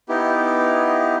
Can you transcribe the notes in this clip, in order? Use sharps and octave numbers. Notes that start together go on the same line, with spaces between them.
B3 D#4 E4 G4